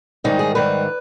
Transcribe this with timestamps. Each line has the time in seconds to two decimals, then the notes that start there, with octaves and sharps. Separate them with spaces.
0.24 G#2 D#3 G3 D#4
0.39 G#4
0.55 G#2 D#3 G3 B4